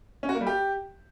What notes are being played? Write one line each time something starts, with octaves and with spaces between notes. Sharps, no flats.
C#4
F#4
A#3
G3
G4